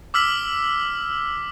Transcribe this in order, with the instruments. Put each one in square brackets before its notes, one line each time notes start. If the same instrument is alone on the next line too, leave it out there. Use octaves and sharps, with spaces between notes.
[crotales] D6 E6 F6 B6 F#7